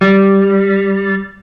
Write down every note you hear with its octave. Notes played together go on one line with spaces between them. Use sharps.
G3